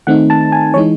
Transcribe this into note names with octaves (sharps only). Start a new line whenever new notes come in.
D#3 A3 C4 D#4 F#5
A5
G#5
E3 G#3 D#4 C#5